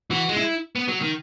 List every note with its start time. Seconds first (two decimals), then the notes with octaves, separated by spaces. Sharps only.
0.11 E3 F#4
0.29 G#3
0.37 E4
0.75 B3
0.88 F#3
1.01 D#3